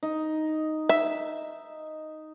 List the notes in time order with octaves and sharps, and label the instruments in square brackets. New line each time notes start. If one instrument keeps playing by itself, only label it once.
[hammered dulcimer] D#4
[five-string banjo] E5